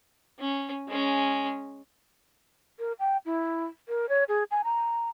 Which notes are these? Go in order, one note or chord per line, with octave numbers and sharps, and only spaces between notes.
C#4
G#3 C#4
A#4
G5
E4
A#4
C#5
G#4
G#5
A#5